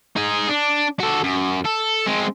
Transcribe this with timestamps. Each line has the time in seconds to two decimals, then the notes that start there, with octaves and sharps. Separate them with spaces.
0.16 D#4 G#4
0.49 D4
1.00 F#4 A4
1.24 F#2
1.65 A4
2.06 G#3 C4